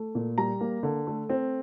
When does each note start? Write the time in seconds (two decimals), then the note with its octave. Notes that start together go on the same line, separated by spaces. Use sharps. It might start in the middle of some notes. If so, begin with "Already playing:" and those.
Already playing: A3
0.15 A#2
0.38 G3 A#5
0.61 A#3
0.83 D3
1.07 A3
1.29 C4